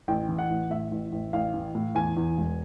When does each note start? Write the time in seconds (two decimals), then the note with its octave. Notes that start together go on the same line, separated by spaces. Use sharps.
0.08 A1 G5
0.29 E3
0.39 F#5
0.50 A1
0.70 A2 E5
0.91 A1
1.12 A1
1.33 A1 F5
1.54 E3
1.75 A2
1.95 E2 G#5
2.17 E2
2.38 E1